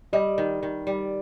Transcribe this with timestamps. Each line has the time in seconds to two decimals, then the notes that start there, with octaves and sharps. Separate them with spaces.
0.13 G3 D#5
0.38 D#3
0.63 D#3
0.87 G3